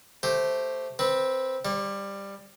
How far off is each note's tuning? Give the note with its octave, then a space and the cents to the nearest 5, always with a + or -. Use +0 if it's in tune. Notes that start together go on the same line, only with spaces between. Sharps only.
A3 +0 G4 +0 C5 +0
C4 +0 B4 -15
G3 +15 C#5 -45